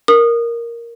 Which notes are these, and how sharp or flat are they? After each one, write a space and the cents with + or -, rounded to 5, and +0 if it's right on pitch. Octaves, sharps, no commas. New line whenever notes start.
A#4 +0 D#6 -20